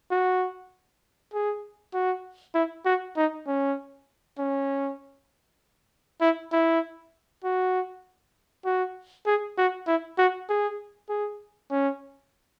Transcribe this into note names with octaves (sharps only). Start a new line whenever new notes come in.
F#4
G#4
F#4
E4
F#4
D#4
C#4
C#4
E4
E4
F#4
F#4
G#4
F#4
E4
F#4
G#4
G#4
C#4